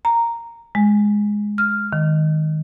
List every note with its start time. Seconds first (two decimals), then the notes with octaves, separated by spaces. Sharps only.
0.05 A#5
0.75 G#3
1.58 F6
1.93 D#3